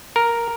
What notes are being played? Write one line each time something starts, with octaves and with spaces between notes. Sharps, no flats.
A#4